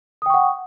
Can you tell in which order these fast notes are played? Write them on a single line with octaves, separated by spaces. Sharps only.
D#6 G5 C#6 F#5